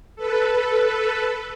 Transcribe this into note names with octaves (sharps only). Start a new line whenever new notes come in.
A4 B4